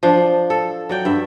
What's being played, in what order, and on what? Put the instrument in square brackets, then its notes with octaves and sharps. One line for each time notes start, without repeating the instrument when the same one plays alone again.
[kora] F3 D4
A4
F#3 D5 G5
G2 E5